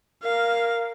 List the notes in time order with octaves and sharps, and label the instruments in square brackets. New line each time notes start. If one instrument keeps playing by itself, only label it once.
[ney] A#4 [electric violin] F5